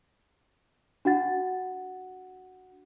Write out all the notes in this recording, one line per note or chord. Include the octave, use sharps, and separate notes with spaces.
D4 F#4 F#5 A6